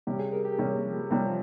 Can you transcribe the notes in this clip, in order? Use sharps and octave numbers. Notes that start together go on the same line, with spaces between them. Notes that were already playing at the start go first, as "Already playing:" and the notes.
C3 G3 C#4 G4
G#4
A#4
G4
C3 G3 C#4
A#3
F3
G3
C3 F3 G3 C#4
F3